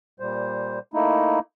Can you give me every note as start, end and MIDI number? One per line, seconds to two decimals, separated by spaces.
0.20 0.79 46
0.20 0.79 55
0.20 0.79 72
0.94 1.39 57
0.94 1.39 58
0.94 1.39 63
0.94 1.39 64